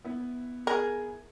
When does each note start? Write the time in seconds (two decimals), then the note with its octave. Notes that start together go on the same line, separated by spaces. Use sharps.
0.04 B3 E4
0.67 G#4 A#4